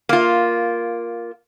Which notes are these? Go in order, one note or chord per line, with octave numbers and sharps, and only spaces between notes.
A#3 F4